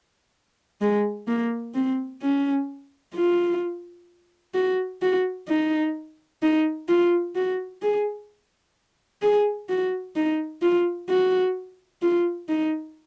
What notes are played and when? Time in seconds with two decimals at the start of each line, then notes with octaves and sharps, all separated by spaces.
0.81 G#3
1.28 A#3
1.75 C4
2.22 C#4
3.15 F4
4.54 F#4
5.02 F#4
5.48 D#4
6.43 D#4
6.89 F4
7.36 F#4
7.82 G#4
9.22 G#4
9.69 F#4
10.16 D#4
10.62 F4
11.09 F#4
12.02 F4
12.49 D#4